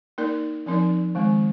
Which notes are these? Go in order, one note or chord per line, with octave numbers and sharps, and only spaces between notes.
A#3 D#4 A#4 D5
F3 C4 D#4 A#4 D5
D#3 G#3 C4